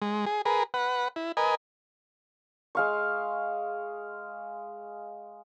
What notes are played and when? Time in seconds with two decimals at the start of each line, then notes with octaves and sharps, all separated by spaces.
0.02 G#3
0.26 G#4
0.45 G#4 A#4 B4
0.74 B4 F#5
1.16 E4
1.37 A#4 B4 D#5 G#5
2.75 G#3 F5 C#6